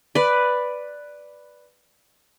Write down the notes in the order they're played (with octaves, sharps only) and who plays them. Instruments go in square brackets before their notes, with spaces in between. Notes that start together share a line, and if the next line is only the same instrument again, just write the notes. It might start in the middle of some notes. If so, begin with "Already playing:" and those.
[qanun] B4 D5